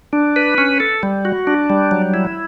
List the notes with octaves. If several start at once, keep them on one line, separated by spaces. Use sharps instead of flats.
D4
B4
C#4
A4
G3
F#4
D4
G3
F#3
E4